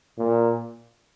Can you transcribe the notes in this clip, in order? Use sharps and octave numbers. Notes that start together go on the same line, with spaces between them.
A#2